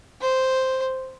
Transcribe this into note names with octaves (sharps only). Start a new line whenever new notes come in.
C5